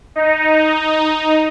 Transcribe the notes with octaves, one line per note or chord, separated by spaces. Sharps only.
D#4